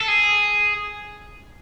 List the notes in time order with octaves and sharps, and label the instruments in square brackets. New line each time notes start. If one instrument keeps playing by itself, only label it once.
[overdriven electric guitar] A4
G#4